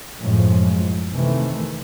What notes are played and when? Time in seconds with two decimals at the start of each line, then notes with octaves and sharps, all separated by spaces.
0.20 F#2 A2 F3 G#3
1.12 C3 D#3 E3 A3